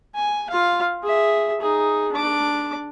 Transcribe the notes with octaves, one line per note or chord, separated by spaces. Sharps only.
G#5
F4 F5
G#4 E5
D#4 G#4
D4 D6